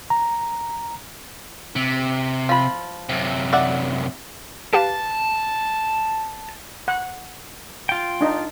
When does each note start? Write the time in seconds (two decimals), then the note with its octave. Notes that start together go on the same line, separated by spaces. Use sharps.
0.10 A#5
1.76 C3
2.49 F3 B5
3.09 F#2 C3
3.53 D5 E5 F#5
4.73 G4 B4 F5 A5
6.88 F#5
7.89 F4 G5
8.21 D4 D#4